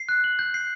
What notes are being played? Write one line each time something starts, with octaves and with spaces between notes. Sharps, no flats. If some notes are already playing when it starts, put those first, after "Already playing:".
Already playing: C7
F#6
F#7
G6
C7